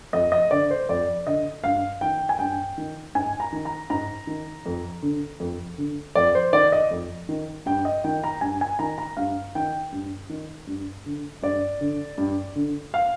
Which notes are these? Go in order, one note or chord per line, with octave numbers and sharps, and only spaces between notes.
F2 D#5
D#5
D3 D5
C5
F2 D5
D3 D#5
G2 F5
D#3 G5
G#5
G2 G5
D#3
G#2 G#5
A#5
D#3
A#5
G#2 A#5
D#3
F2
D3
F2
D3
F2 D5
C5
D#3 D5
D#5
F2
D#3
G2 G5
D#5
D#3 G5
A#5
G2 G#5
G#5
D#3 A#5
A#5
G2 F5
D#3 G5
G2
D#3
G2
D3
G2 D5
D3
G2
D3
F5